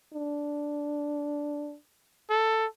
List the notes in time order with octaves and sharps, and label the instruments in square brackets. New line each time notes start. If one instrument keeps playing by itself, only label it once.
[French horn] D4
[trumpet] A4